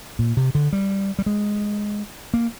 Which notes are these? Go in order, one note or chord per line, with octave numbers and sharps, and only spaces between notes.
A#2
C3
D3
G3
G3
G#3
A#3